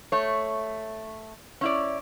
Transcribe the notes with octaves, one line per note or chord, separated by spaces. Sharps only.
A3 C#5
C#4 E4 D5